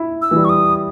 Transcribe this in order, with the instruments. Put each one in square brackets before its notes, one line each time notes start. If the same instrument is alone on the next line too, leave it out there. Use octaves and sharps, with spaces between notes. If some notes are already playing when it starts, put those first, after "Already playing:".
Already playing: [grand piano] E4
[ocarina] E6
[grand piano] E3
G3
[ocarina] C#6
D#6